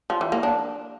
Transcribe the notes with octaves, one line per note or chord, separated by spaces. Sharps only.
F3
E3
A#3
D4